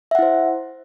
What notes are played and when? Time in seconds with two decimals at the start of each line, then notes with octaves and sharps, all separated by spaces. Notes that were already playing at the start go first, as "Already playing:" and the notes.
0.11 E5
0.15 F#5
0.19 E4
0.22 C5